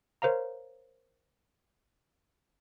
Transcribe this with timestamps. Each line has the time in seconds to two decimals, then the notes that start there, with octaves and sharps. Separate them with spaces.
0.22 A#4 C5 C#5 F5 A#5